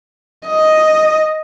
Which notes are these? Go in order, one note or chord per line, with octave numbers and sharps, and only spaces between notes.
D#5